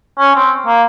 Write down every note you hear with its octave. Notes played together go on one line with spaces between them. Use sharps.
C#4
C4
A#3